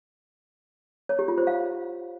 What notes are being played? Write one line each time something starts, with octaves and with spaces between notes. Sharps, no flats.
C#5
G4
F4
C5
F5